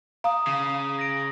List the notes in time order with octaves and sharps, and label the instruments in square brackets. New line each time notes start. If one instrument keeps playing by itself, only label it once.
[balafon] F5 [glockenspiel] A#5 D#6
[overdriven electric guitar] C#3
[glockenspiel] A#6 D7